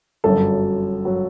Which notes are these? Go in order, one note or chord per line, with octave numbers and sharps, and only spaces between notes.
G1 F#2 F#3 A4
F#3